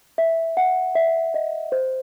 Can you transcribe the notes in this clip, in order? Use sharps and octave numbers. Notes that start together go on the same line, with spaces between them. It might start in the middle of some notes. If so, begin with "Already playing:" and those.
E5
F#5
E5
D#5
C5